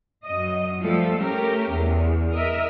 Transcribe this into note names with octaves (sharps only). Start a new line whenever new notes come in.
F#2 D#5
F3 G3 A3 A4
A3 C#4 G4 A#4
E2
A#4 D#5 E5